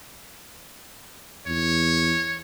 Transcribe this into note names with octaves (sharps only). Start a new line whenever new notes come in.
E2 C#5